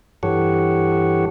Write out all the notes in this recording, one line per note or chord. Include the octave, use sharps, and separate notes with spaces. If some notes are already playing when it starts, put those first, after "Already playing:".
G2 E3 G4 A4 C#5 F#5